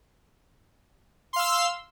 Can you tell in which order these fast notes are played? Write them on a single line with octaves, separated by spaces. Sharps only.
C6 F5 E6